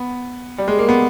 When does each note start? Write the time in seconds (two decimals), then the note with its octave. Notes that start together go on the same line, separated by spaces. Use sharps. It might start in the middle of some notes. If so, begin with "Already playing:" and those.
Already playing: B3
0.58 G3
0.68 G#3
0.79 A#3
0.89 B3